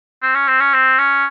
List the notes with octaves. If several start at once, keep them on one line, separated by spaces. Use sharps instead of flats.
C4
C#4
C4
C#4
C4
C#4